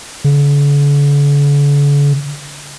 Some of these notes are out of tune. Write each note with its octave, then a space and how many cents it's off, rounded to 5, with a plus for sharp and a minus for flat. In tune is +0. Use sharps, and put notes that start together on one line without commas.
D3 -45